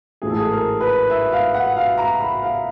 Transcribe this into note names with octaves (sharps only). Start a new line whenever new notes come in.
A1 G#2 E3 A3 G#4
A4
G#4
A#4
B4
E5
F5
F#5
F5
A#5
B5
F5